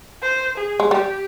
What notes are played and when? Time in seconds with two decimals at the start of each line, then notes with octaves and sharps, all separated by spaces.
0.22 C5
0.57 G#4
0.80 G#3
0.91 G3 G4